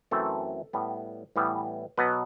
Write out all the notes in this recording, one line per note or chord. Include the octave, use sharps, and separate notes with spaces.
F#2 E3 A3 C4 A4
A2 G3 B3
A2 E3 G3 B3
B2 F#3 B3 B4